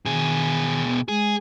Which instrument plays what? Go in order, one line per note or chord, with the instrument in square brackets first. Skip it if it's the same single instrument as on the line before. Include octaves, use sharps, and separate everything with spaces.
[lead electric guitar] B2 G#4 [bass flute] D#3
[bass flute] B3
[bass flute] G#3 [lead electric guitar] G#4